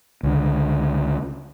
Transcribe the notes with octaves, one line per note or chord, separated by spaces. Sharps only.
C#2 D3